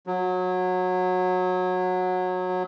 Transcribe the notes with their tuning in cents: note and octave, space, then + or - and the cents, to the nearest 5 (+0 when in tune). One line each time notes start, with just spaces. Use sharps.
F#3 -20